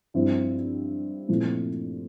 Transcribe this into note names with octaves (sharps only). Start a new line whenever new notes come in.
G2 F3 C4 E4
A#2 F3 A3 C4 E4